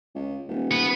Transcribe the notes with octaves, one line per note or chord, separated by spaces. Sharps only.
C#2
D#1
B3 B4